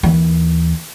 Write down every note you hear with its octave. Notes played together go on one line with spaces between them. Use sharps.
D#2 E3